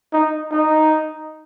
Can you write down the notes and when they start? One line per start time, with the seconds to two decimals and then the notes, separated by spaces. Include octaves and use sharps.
0.13 D#4
0.52 D#4